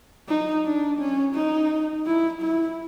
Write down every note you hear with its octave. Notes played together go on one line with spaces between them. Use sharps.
D#4
D4
C#4
D#4
E4
E4